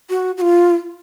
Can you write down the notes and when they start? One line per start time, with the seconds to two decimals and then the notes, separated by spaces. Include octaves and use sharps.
0.10 F#4
0.37 F#4
0.41 F4